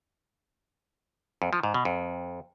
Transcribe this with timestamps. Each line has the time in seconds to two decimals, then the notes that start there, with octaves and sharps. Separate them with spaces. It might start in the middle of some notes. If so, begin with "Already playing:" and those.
1.42 F2
1.53 F3
1.63 G#2
1.74 B2
1.85 F2